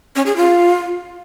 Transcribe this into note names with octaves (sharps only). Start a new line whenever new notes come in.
C#4
G#4
F4